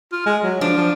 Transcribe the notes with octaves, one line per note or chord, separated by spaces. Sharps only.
F4
G#3
F#3
F3 D4
F3